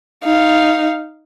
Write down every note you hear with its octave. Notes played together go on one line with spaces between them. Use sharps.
D#4 F5